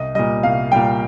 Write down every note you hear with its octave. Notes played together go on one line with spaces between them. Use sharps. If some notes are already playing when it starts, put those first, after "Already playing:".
Already playing: C2 D#5
A#2 G3 D#5
C2 F5
A#2 G3 G5